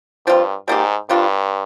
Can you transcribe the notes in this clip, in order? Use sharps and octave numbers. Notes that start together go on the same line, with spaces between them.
G2 F3 C4 F4
G#2 G3 A#3 D#4 G4
G2 C3 G3 D4 F4